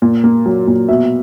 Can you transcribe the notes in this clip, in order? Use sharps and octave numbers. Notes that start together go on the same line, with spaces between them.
A#2
A#3
F#3
A#2
B2 E5